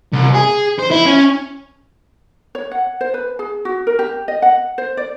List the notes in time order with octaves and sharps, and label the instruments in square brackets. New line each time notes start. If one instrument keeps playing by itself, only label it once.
[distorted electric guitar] C2
G#4
C5
E4
C#4
[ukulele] C#5
F#5
C5
B4
G#4
F#4
A#4
G4
D#5
F#5
C5
D5